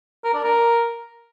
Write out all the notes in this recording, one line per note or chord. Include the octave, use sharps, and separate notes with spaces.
A#4
D4
A#4